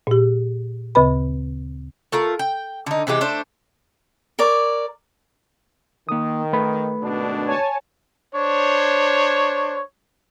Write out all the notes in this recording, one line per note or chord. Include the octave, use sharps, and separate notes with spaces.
A#2 G4
D2 C#3 B4 B5
A3 F4 A#4
G5
D3 D#4
C3 E3 G#3 G4
A3 D4 C5
A#4 C#5 D5
D#3 A#3 D#6
A3 B4 B5
G#1 B2 D4
C#5 G#5 A5
D4 C5 C#5